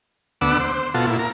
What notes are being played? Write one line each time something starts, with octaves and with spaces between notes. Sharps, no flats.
D2 B3 F#5 D6 E6
C5
C5
B2 F4 F#4 A4
A#2 E4
A#4